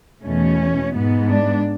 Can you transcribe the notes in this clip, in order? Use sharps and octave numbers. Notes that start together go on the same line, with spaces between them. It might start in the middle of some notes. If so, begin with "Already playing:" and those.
E2 B2 A3 C#4
G#2 G#3 B3
D4